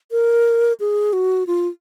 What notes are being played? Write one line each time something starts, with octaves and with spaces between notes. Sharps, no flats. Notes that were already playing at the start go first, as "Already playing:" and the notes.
A#4
G#4
F#4
F4